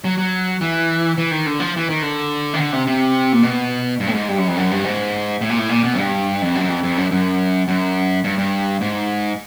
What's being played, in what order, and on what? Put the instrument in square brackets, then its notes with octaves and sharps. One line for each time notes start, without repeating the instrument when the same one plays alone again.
[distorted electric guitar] F#3
F#3
E3
E3
D#3
D3
F3
E3
D#3
D3
D#3
D3
C3
C3
A#2
B2
G2
A2
G#2
G2
F#2
F2
F#2
G2
G#2
A2
A#2
A2
A#2
B2
F#2
G2
F2
F#2
F2
F2
F#2
F#2
F#2
G2
G2
G#2